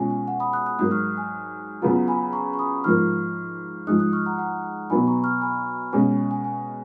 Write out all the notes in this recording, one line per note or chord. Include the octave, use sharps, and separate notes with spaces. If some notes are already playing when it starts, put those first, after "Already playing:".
Already playing: B2 G#3 C#4 F4 G#5
G#5
F#5
B5 D#6
D#6 F#6
D#6 F#6
G#2 F#3 A#3 D#6 F#6
C#6 F6
G#5
C#3 F#3 B3 F4 F#5 A#5
G#5 B5
A#5 C#6
C#6
B5 D#6
G#2 F3 A#3 C#6 F6
G#2 F3 G#3 D#4 D#6 F#6
D#6 F#6
C#6 F6
F#5 A#5
F#5 A#5
B2 F#3 B3 D#4 G#5 B5
A#5 C#6
C#6 F6
G#5 B5
B2 G#3 C#4 G#5
G#5
G#5
G#5